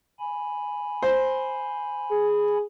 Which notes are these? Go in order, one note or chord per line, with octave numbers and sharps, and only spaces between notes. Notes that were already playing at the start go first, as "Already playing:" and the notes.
G#5 B5
C5
G#4